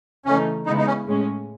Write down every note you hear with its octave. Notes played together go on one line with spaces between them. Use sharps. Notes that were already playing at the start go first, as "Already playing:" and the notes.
C#3 E3 A3 C#4 D#4
C#3 G#3 B3 D#4 E4
D#4
C#4
A2 G#3 C#4